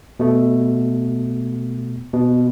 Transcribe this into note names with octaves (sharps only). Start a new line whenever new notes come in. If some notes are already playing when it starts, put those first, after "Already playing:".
B2 A3
B2